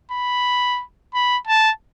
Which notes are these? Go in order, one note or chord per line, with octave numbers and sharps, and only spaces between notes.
B5
B5
A5